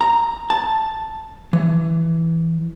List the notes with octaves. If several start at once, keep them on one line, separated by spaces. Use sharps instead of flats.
A#5
A5
E3